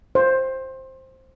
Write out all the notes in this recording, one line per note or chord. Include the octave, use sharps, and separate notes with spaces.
C5